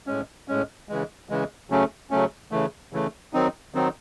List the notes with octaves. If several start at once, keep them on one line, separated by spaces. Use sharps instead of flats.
A2 G#3 C#4
A2 G#3 C#4
C#3 E3 G#3
C#3 E3 G#3
C#3 F#3 A3 C#4
C#3 F#3 A3 C#4
C#3 E3 A3
C#3 E3 A3
D#3 F#3 C4 D#4
D#3 F#3 C4 D#4